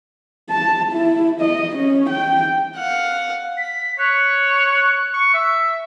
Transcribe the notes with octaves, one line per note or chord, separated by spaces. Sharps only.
A5
E4
D#5
C#4
G5
F5 F#5
B6
C#5 F#6
C#6
E5